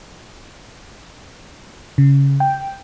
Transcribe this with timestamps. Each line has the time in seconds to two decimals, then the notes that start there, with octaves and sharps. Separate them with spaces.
1.98 C#3
2.40 G5